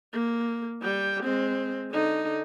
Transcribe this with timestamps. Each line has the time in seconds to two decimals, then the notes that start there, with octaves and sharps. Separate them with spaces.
0.13 A#3
0.82 G3 G5
1.23 G#3 C4
1.91 D3 D#4